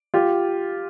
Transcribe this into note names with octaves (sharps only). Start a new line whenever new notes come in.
F4 G4